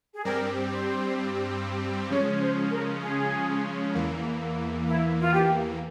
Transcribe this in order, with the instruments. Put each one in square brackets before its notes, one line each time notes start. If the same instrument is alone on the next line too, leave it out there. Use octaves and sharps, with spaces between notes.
[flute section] G#4
[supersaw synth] G2 G3 C4 G4 [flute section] A#4
[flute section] C5
[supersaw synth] C#3 F3 G#3 C#4 [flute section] C#5
[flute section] C5
A#4
G#4
[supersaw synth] E2 E3 A#3
[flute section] E4
F4
G4